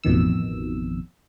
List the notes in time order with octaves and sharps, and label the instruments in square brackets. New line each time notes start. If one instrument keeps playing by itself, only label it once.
[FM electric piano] A1 F2 B2 D#3 E6